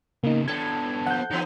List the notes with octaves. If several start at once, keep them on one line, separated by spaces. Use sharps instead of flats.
C#3 A#3 B3 D#4
A2 B3 D4 A4 G#6
F3 F#5 G6
D3 E3 B3 D#4